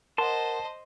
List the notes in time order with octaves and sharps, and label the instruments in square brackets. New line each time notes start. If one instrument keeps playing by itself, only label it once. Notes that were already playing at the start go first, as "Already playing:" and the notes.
[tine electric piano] A#4 F#5 [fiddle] C5 D#5 [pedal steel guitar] A5 C6